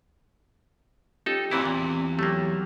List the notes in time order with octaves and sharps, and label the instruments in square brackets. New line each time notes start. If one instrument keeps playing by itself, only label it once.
[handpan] C#4 F4 G4 [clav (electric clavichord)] D#4 A4
[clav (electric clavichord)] A#2 E3 E4 [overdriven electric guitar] A#3 F#4 [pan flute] C4
[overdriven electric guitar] E2 [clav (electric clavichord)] A#2
[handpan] F#3 G4 [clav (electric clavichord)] A3 A#3